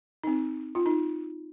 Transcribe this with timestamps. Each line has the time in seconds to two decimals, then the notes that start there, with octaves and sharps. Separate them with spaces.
0.24 D#4
0.27 C4
0.75 F4
0.86 D#4